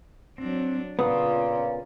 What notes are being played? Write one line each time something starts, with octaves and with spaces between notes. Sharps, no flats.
F#3 C4 D4
A#2 C#3 B3 C#4 F4 D#6